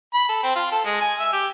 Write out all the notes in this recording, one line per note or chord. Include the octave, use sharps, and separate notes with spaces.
B5
A4
C4
F4
A4
G#3
G#5
E5
G4